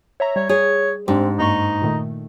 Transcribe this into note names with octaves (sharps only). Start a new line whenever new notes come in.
C#5 E5 A#5
G3 C#5
G#4 C#5
G#2 C4 D4 G4
G2 A#3 D#4 C#6
A#2 D#3 A3